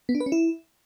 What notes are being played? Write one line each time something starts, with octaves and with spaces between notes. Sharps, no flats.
B3
D4
B4
C#4
E4